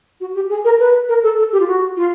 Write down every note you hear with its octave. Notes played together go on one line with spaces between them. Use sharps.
F#4
G4
G#4
A#4
B4
A#4
A4
A4
G4
F4
F#4
F4